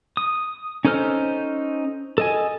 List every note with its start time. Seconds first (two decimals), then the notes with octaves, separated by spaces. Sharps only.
0.17 D#6
0.85 C#4 D#4 A4 C5 F6
2.18 A4 D#5 G#5